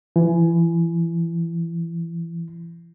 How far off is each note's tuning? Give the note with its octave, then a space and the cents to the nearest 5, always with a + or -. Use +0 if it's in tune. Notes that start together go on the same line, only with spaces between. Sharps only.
E3 +25